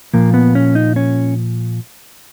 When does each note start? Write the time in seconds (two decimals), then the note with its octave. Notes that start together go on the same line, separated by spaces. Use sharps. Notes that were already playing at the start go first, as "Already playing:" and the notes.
0.14 A#2 F3 A#3
0.34 B3
0.55 C#4
0.75 D#4
0.96 C#4